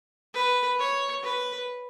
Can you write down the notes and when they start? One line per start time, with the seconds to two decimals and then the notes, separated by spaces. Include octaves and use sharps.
0.34 B4
0.79 C#5
1.23 B4